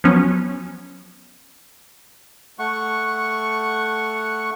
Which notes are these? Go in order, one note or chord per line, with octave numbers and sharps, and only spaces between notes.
F3 F#3 B3 C#4
A3 F#5 C#6